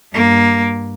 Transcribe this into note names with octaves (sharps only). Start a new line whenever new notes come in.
G2 A#3